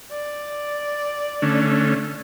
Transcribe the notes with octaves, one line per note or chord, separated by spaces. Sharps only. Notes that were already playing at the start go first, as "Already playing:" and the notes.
D5
D3 A3 C#4